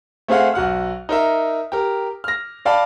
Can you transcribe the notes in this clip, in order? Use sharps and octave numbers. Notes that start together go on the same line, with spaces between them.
A3 C4 G#4 F5 F#5
B1 F#4 F#5 F6
D#4 A#4 E5
G4 A#4
F6 A#6
D5 F5 G5 A5 B5